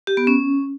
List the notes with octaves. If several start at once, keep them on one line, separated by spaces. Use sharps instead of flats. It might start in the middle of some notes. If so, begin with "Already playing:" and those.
G4
B3
C#4